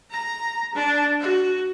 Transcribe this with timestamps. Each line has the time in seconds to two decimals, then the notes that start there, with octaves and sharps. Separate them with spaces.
0.11 A#5
0.75 D4
1.20 F#4